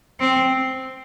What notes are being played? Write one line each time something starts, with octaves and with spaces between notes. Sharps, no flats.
C4